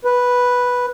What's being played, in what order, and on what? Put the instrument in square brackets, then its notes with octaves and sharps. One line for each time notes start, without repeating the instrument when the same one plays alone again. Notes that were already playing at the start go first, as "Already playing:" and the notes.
[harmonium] B4